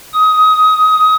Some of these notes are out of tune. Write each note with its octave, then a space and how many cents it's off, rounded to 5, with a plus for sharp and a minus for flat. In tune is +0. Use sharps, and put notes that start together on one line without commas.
D#6 +20